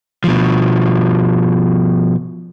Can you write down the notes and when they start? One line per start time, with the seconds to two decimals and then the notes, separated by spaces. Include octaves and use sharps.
0.24 B2 F3